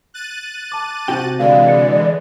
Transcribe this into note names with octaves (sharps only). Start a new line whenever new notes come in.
F#6 A6 D#7
A5 D6
C3 F#4 G5
D3 E3 G#3 D5 F5
C#7